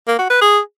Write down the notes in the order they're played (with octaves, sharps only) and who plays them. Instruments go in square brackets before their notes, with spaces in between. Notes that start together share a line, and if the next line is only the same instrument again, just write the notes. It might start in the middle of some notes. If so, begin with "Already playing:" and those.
[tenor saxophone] A#3
F#4
B4
G#4